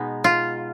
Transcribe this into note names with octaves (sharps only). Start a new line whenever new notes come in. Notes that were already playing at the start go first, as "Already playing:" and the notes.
Already playing: B2 G#3 B3 D#4
F4